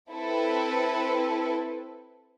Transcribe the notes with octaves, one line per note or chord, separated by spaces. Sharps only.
C4 E4 A4 B4